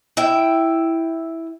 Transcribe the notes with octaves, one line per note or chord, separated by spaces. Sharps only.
E4 E5 G5